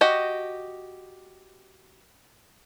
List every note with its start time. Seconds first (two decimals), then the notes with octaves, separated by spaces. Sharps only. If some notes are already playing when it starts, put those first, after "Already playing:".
0.01 F#4 G4 D#5